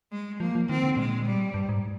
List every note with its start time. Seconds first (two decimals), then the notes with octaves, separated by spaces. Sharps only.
0.12 G#3
0.40 F3 A#3
0.55 F3
0.69 D#3 C4
0.84 D3
0.97 A#2 G#3
1.26 G3
1.54 G2
1.69 G#2